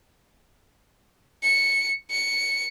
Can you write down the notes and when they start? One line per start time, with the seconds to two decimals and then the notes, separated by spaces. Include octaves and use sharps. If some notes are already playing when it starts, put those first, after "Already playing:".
1.43 C#7
2.11 C#7